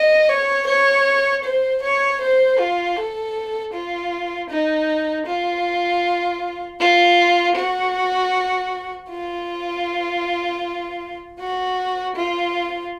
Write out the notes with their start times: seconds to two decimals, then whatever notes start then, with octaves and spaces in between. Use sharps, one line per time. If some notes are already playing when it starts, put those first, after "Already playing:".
Already playing: D#5
0.29 C#5
0.67 C#5
1.44 C5
1.82 C#5
2.21 C5
2.59 F4
2.96 A4
3.73 F4
4.49 D#4
5.26 F4
6.80 F4
7.56 F#4
9.10 F4
11.39 F#4
12.16 F4